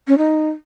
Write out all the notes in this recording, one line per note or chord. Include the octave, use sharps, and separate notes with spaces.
C#4
D#4